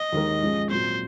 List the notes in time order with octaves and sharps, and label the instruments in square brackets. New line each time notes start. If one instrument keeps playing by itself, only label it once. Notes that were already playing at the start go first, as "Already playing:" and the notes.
Already playing: [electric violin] D#5
[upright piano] D#2 D#3 G#3 D#4 A#4
G#2 F3 G#3 C#4 G#4
[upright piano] A#2 F#3 C4 [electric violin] C5